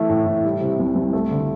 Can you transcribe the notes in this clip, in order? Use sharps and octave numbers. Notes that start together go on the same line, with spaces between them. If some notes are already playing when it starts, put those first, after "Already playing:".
Already playing: E3 A3
A2
A2
G3
C3
C2
C2
A3
D3